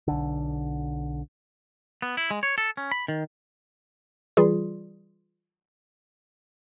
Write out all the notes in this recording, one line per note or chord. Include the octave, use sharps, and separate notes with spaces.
B1 D3
B3
E4
G#3
C#5
A4
C#4
B5
D#3
E3 G3 F4 G#4